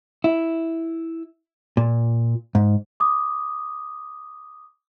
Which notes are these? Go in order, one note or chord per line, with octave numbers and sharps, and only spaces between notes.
E4
A#2
G#2
D6 D#6